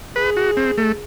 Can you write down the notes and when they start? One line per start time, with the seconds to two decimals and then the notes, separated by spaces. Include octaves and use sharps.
0.16 G#4 B4
0.37 F#4
0.57 C4
0.78 A3